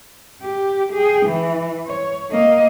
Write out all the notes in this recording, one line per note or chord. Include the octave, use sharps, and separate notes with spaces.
G4
G#4 G5
E3
C#5
A#3 D#5